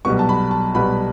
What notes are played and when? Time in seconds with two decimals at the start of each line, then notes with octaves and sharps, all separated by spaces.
0.05 B1 B2 G3 B3 C#6
0.19 A5
0.29 B5
0.51 A5
0.74 B1 B2 G3 B3 B5